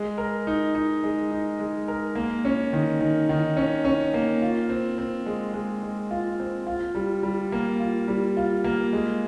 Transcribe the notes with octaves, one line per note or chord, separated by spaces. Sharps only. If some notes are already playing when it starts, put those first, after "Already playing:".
Already playing: G#3
A#4
D#4
D#4
G#3
D#4
G#3
A#4
A#3
C#4
D#3
D#3
D#3
C#4
C#4
A#3
F4
C4
C4
G#3
G#3
G#3
F4
C4
F4
G3
G3
A#3
F4
G3
F4
A#3
G#3